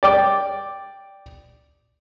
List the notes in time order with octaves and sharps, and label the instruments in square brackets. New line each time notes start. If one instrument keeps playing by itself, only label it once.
[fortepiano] D5 G5 D6